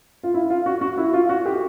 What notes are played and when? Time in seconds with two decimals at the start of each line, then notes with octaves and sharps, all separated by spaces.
0.23 F4
0.34 E4
0.50 F4
0.66 F#4
0.81 F#4
0.97 E4
1.13 F4
1.29 F#4
1.46 G4